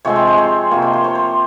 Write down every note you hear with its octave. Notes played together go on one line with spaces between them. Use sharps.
C3 F3 G#3 C4 C#5
C5
C5
C#5
C3 F3 A#3 C#5
C5
C5
C#5
C5